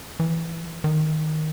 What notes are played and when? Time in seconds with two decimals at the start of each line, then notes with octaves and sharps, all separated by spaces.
0.20 E3
0.84 D#3